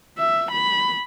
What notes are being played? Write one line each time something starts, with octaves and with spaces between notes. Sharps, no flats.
E5
B5